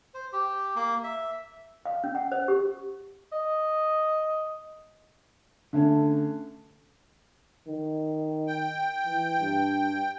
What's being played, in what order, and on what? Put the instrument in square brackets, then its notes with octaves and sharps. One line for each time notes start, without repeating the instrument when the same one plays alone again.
[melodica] C5
G4
A#3
E5
[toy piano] F5
C#4
F#5
C5
G4
[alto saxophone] D#5
[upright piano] D3 A3 C#4
[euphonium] D#3
[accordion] G5
[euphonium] E3
G2